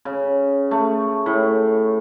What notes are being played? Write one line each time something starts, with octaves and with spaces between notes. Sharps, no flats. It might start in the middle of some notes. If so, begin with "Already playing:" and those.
C#3
A3
A2